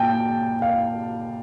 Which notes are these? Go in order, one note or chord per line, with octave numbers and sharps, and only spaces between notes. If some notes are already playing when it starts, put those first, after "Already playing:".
Already playing: A#2 G5 A5
F5